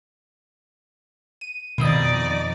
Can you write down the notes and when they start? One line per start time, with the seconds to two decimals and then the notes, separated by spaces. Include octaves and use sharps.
1.41 D#7
1.78 F2 B2 D#3 D#4 D5 D#6